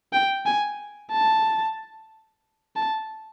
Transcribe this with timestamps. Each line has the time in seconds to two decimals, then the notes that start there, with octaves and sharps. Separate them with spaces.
0.13 G5
0.46 G#5
1.12 A5
2.76 A5